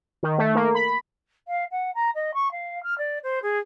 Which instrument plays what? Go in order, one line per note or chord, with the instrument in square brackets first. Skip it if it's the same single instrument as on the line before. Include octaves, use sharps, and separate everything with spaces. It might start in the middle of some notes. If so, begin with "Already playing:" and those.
[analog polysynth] D#3
A3
A#3
B5
[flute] F5
F#5
A#5
D#5
C#6
F5
F6
D5
C5
G#4